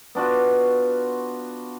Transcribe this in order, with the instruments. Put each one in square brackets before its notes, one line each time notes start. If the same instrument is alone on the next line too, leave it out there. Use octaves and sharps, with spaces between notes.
[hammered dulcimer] B3 D4 F4 F#4